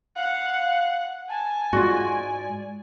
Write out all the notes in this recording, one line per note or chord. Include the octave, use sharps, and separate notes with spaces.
F5 F#5
G#5 A5
G#2 G#3 F4 F#4 D5